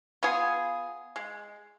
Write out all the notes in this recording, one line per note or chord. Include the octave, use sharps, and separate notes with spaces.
B3 F4 G#4
G#3